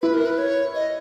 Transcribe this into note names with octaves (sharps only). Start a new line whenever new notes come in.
E4 B4
A#4
B4
C#5
D#5